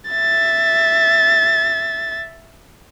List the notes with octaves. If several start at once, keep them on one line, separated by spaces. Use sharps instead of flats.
E5 A6